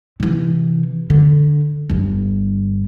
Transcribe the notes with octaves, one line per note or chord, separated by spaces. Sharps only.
C3 E3
D3
G1 G2